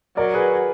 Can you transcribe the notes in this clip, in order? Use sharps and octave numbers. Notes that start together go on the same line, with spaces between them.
F#3 A#4 D5
G#4 B4